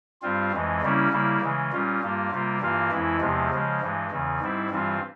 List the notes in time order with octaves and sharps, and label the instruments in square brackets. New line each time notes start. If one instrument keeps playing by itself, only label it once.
[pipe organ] G2 G3 C4 F4
F2 E3 G#3
C#3 G3 A#3 C#4 E4
C#3 G3 A#3 E4
C#3 E3 G#3
A#2 G3 C#4 F4
G2 G3 A#3 F4
C3 G3 A#3 F4
G2 E3 A#3 F4
F2 E3 G#3 E4
E2 C3 F3 G#3
C#3 F3 G#3
G2 E3 G#3
E2 C#3 E3
G#2 G3 C4 E4
G2 E3 G3 C4 F4